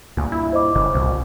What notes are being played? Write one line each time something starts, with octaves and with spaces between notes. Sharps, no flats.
D2 G2 A#2
E4
C5 D#5 D6
G1 C#3
C2 A#2 C#4